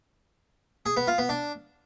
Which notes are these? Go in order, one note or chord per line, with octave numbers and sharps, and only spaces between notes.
G#4
B3
F4
B3
D4